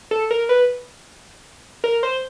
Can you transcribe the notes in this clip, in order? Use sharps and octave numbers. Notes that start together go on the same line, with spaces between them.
A4
A#4
B4
A#4
C5